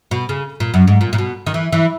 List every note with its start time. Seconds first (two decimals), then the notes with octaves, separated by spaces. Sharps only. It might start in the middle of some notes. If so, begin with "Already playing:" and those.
0.11 B2
0.29 C#3
0.60 A#2
0.74 F#2
0.87 G#2
1.01 A#2
1.13 A#2
1.18 B2
1.46 D#3
1.54 E3
1.72 E3